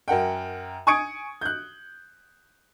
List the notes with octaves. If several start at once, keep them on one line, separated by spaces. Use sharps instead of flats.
F#2 A#4 F#5 G5
G#5 C#6 D#6 G#6 C#7 D7
F#6 G6